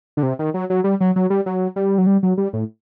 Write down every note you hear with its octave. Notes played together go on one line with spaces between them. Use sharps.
D3
C3
D#3
F#3
F#3
G3
F#3
F#3
G3
F#3
G3
F#3
G3
F#3
G3
A2